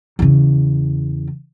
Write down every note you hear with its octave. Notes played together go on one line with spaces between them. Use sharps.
E2 C#3